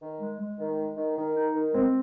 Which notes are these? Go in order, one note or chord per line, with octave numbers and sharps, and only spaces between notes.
D#3
G#3
G#3
D#3
G#3
D#3
D#3
D#4
D#3
G#3 C4